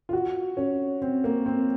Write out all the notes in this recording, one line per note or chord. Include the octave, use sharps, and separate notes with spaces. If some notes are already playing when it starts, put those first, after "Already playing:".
F4
F#4
C#4
C4
A#3
C4